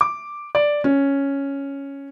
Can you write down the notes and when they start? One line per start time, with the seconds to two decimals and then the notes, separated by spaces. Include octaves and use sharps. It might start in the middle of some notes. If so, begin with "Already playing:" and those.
0.01 D6
0.55 D5
0.84 C#4